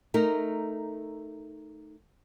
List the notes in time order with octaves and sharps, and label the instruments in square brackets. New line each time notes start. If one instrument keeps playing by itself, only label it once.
[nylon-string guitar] A3 D#4 A#4